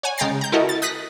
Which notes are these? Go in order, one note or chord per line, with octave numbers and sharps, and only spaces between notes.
C#5 F#5 G#5
C#3 G#3 G5 A#5 A6 C7
A#5 G6
E4 F#4 A4 A#4 D#5
A6
D#6 F#6 A#6 B6